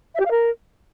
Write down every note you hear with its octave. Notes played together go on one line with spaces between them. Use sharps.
E5
G4
F5
A#4